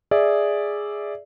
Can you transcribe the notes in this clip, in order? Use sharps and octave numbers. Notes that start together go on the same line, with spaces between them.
G#4 D5 E5